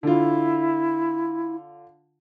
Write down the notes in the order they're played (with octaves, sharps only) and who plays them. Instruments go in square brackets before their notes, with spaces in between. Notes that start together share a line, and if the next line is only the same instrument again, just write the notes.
[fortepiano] D3 F4 [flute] E4